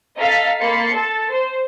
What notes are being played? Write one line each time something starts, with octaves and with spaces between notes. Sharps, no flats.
A4 D#5 F5 A#5 B6
A#3 B5 C6 A6 C#7
A4 A5
C5